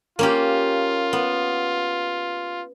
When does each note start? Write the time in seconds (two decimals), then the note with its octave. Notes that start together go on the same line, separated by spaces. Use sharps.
0.19 A#3 C#4 F4 G4
1.13 B3